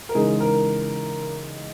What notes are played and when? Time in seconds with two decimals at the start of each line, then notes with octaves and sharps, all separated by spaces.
0.09 A#4
0.15 C#3 E3 G#3 D#4 G#4
0.40 A#4